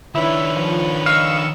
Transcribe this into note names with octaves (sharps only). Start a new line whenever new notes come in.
D#3 D4 E4 B4 C#5 E5
F3
D#5 F5 C#6 E6